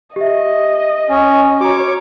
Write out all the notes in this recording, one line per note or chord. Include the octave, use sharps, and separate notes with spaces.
G4 D#5 E5
C#4 G#5
F#4 C#5 A#5 D6